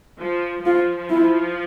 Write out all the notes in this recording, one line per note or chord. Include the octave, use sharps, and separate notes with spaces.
F3
F3 F4
E4